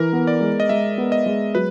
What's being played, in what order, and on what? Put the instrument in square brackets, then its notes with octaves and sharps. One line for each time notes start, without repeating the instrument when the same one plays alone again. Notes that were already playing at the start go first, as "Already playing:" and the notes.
Already playing: [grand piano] E3 [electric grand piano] A#4
[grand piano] B3
[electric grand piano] D5
[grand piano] G#3
[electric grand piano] D#5
[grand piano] G#3 [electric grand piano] E5
[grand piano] B3
[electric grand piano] D#5
[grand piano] G#3
[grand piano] F#3 [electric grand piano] B4